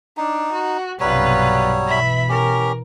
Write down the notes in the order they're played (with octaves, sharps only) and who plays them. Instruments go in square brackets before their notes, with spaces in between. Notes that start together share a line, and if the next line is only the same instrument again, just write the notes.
[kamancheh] D4 [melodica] D#4
[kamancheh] F#4
[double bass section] B1 G2 C3 [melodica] F#3 G3 C#5 [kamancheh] F4 B4
[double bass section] B2 E3 [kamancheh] E5 B5
[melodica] C#4 G4 [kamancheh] A#4